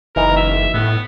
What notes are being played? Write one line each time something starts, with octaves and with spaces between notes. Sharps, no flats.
F#1 E3 D#4 A#4
E5
A2 B3